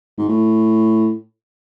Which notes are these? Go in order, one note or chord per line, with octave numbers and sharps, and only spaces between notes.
G#2
A2